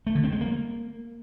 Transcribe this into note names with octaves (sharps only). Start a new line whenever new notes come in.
A3
D3
C4
G#3
A#3